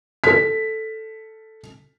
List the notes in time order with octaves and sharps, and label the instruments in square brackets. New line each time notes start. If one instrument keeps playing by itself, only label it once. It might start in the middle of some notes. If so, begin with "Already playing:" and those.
[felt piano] A4 B6